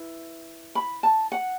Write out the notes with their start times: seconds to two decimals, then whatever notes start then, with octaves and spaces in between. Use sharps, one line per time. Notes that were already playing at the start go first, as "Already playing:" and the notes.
Already playing: E4 B4
0.75 B5
1.03 A5
1.32 F#5